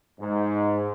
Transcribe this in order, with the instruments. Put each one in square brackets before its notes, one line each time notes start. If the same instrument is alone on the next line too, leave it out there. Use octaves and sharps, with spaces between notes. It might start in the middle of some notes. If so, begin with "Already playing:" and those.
[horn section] G#2